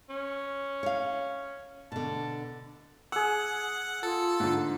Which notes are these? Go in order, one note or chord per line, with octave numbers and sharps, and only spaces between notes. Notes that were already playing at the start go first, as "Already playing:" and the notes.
C#4
C#5 F5
B2 D3 A5
G#4 F#5 E6
F4 A4
G#2 D3